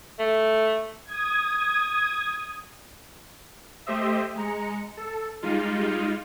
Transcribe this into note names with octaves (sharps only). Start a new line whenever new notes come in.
A3
D#6 G#6
A3 G4 C5 D#5 E5
G#3 A#5 C#7
A4
G3 G#3 D#4 F4